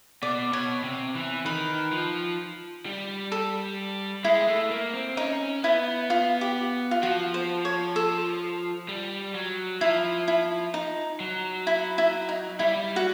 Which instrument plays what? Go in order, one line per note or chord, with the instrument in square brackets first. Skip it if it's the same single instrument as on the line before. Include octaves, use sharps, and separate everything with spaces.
[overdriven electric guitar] B2 [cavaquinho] D5
[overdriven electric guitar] B2 [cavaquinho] C#5
[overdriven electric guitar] C3
E3
[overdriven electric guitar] D#3 [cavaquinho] B4
[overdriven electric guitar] F3
G3
[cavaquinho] A4
[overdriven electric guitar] G#3 [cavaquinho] E4
[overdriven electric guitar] A3
A#3
C4
[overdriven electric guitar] C#4 [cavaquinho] D#4
[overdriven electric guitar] B3 [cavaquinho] E4
[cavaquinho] F4
G4
F4
[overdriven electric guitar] F3 [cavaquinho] F#4
[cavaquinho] C5
C#5
A4
[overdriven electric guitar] G3
F#3
[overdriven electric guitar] F3 [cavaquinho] E4
[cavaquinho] E4
D#4
[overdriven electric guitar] F#3
[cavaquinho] E4
E4
D#4
[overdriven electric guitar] G3 [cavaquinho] E4
[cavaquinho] F#4